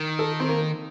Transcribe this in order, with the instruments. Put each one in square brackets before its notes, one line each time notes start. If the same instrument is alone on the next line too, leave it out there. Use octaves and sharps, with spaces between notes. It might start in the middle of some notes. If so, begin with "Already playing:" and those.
Already playing: [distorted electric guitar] D#3
[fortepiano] A4
C4
A#3